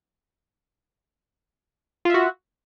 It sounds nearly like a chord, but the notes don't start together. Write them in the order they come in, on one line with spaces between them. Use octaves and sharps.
F4 E5 F#4